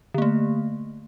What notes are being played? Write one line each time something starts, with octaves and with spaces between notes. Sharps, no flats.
D3 A3 A#3